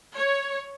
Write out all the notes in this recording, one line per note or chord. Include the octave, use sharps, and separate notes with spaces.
C#5